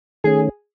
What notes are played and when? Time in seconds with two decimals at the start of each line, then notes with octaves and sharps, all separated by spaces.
0.24 D#3 A3 C#4 G#4